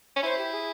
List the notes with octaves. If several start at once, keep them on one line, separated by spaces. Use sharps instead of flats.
C#4
E4 C5
G4
G#4